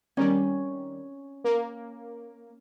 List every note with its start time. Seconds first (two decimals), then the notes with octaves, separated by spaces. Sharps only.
0.17 D#3 G3 C#4
1.44 A#3